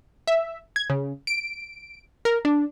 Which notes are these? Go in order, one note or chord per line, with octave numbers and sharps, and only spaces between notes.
E5
G#6
C#3
D7
A#4
D4